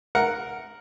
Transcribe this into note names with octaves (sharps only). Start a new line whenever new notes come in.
A#4 F#5